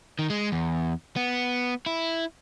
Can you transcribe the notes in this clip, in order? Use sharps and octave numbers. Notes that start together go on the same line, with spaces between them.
D#3
G#3
E2
B3
E4